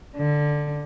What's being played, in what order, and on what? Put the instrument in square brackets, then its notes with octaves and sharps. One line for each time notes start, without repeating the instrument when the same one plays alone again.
[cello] D3